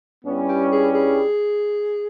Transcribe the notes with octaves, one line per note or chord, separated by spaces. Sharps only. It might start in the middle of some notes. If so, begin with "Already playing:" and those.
G2 G3 B3 C#4 E4
G4
G#4
G#4